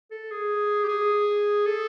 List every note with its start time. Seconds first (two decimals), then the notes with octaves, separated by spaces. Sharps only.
0.11 A4
0.31 G#4
0.84 G4
0.89 G#4
1.66 A4